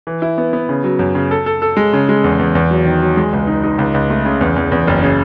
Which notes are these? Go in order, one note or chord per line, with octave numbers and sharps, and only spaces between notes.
E3
E4
B3
B3
C#3
F#3
F#2
C#3
A4
A4
A4
G#3
C#3
G#3
E2
E2
E2
F#3
D#3
F#3
G#3
C#2
D#4
D#4
C#2
C#2
A3
C#3
E2
E2
E2
F#1
C#3